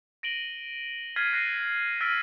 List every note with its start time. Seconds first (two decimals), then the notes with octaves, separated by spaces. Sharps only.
0.23 A#6 D7 D#7 F#7 G7
1.16 F6 G#6 A6 B6 C7 D#7
1.33 F#6 A#6 C7 D#7
2.01 E6 F6 A6 B6 D7 D#7